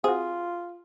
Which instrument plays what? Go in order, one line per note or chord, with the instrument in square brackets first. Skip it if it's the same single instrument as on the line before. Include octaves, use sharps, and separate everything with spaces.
[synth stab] C4 F#4 [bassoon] F4 [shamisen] G#4